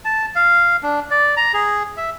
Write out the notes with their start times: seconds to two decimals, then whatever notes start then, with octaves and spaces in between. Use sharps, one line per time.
0.05 A5
0.35 F5
0.83 D4
1.11 D5
1.37 A#5
1.54 G#4
1.97 E5